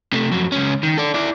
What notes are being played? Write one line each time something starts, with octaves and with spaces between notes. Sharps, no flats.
C3 A3
F2 F#3
C#2 C#4
D#3
A4 D5
E4 D5